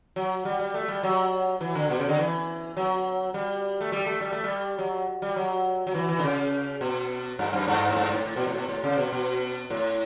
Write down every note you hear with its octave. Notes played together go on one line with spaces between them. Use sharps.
F#3
G3
G3
A3
G3
F#3
E3
D3
B2
C#3
D3
E3
F#3
G3
A3
G3
A3
G3
A3
G3
F#3
G3
F#3
F#3
E3
E3
D3
C#3
B2
G2
F#2
G2
A2
G2
A2
A2
B2
A2
B2
A2
C#3
B2
B2
A2